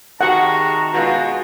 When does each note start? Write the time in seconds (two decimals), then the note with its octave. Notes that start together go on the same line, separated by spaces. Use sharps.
0.21 C3 D#3 G#3 F#4 F#5 A5 A#5
0.93 B2 G#3 F4 F#4